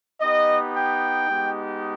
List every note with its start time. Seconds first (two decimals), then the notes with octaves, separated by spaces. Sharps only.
0.21 B3 D#4 G4 D#5
0.75 G5
1.28 G#3 B3 D#4 G4